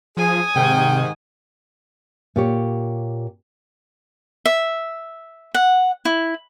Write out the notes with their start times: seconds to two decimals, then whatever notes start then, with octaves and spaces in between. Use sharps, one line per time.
0.17 F3 G#4 G#5 D#6
0.56 G#2 C3 D#3 G5
2.36 A#2 G4 C#5
4.46 E5
5.54 F#5
6.05 E4